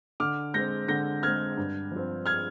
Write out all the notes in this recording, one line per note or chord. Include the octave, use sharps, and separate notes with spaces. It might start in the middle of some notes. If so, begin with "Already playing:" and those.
D3 D6 F6
G#3 C4 G6 A#6
D3 G6 A#6
G#3 C4 F6 G#6
G2
F3 C4
F6 G#6